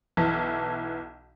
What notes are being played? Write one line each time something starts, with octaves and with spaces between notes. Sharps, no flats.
B1 E3 A5